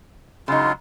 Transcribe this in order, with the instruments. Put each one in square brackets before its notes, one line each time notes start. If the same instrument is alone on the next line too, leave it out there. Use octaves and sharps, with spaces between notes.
[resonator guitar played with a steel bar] C#3 D#4 [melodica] F#3 G#3 F4